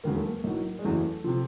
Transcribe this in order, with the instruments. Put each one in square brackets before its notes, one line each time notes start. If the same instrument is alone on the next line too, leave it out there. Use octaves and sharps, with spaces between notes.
[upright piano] E1 D#2 C#3 F#3 A#3
A3
A#3
B1 A2 F#3
G#3
F#1 E2 C#3 F#3 A3
C3 F3